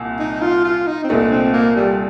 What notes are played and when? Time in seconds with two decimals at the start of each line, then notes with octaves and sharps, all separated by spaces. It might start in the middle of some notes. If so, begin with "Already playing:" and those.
Already playing: C2 A#2
0.20 D#4
0.41 F4
0.64 F4
0.87 D#4
1.04 C4
1.09 C2 A#2 A3 D4 D#4
1.31 C4
1.53 A#3
1.76 G3